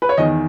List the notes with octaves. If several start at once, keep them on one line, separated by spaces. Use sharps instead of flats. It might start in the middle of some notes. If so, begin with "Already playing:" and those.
B4
C#5
E2 D#3 D#5